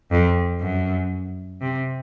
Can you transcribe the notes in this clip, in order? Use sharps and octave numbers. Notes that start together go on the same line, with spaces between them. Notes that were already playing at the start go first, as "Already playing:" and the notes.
F2
F#2
C3